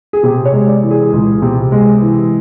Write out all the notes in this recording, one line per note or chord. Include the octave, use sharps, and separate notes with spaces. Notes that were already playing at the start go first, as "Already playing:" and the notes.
G#4
C3 G4
C#5
G#3
D5
E3
G#4
C#2
C3
G#3
E3